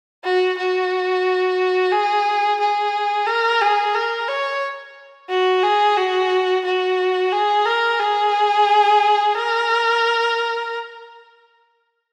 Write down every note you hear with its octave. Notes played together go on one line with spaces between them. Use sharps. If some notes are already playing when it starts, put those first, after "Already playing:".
F#4
F#4
G#4
G#4
A#4
G#4
A#4
C#5
F#4
G#4
F#4
F#4
G#4
A#4
G#4
A#4